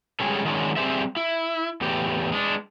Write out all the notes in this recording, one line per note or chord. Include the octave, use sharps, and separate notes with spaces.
G3 G#3 C#4 G#4 A4
D#3 F#3 G#3 C#4 D4
G3 C4 G4 G#4 C5 E5
E4
E2 A2 G4
G#3 D4